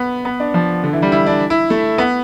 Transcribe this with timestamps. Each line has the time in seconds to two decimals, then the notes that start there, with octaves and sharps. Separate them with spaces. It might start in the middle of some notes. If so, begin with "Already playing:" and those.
Already playing: B3
0.25 B3
0.40 D4
0.54 F3
0.84 D3
0.93 E3
1.02 G3
1.12 E4
1.26 D4
1.50 E4
1.70 A3
1.98 B3